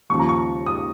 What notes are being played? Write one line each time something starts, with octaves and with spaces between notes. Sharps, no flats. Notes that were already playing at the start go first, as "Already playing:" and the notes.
D#2 C#3 F3 C#6
A#5
C#6
D#6